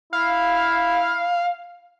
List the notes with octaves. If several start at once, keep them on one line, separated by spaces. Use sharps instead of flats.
E4 F5